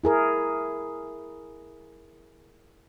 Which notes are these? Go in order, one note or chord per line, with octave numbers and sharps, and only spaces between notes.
E4 G#4 A#4